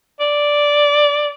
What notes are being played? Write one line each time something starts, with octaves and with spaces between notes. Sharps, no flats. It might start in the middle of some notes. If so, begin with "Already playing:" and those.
D5